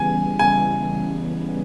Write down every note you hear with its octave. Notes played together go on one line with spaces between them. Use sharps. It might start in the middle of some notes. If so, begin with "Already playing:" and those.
Already playing: C#3 E3 G3 B3 G#5
G#5